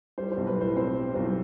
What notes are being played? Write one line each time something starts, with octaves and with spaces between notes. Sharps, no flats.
G3 C5
C5
B1
B4
A2
C5
C4 C5
G3
B1 C5